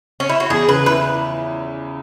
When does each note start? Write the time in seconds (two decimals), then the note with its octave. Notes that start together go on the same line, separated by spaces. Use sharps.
0.20 C#4
0.29 E4
0.40 F#4
0.50 E2 G#4
0.68 C#3 B4
0.86 E4 B4